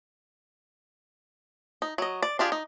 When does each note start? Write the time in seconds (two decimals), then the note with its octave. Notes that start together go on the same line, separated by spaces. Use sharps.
1.82 D#4
1.98 F#3 D#5
2.23 D5
2.39 D4 F4 G4 G#4
2.52 D#4